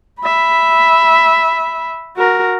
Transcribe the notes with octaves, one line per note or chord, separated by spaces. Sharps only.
E5 B5
F#4 A#4